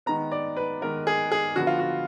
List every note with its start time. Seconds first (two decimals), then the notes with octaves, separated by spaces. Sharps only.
0.06 D#3 G#3 B3 A#5
0.32 D5
0.57 B4
0.81 D#3 G#3 B3 A#4
1.07 G#4
1.32 G#4
1.56 D3 F3 B3 F#4
1.67 F4
1.79 F#4